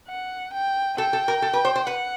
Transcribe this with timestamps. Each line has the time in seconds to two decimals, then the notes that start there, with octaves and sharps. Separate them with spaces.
0.09 F#5
0.54 G5
0.98 A4 G5
1.13 A4
1.28 A#4
1.42 A4
1.53 B4
1.65 C5
1.76 C5
1.87 B4 F#5